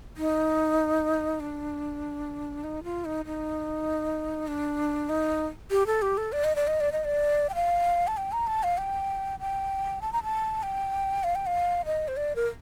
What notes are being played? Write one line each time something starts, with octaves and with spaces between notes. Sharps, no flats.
D#4
D4
D#4
F4
D#4
D#4
D4
D#4
G4
A4
G4
A4
D5
D#5
D5
D#5
D5
D#5
D5
G5
F5
A5
G5
A#5
A5
F5
G5
G5
A5
A#5
A5
G5
F5
G5
F5
D#5
C5
D5
A#4